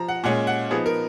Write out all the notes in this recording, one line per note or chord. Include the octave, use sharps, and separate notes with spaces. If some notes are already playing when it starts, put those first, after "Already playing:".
Already playing: F3 A#5
F#5
A#2 G#3 C#4 F#5
F#5
F3 B3 D#4 G#4
A#4